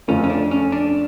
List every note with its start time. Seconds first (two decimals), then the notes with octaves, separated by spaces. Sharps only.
0.08 F2 C#3 F3 A3 C#4
0.24 C#4
0.30 D4
0.51 C#4
0.72 D4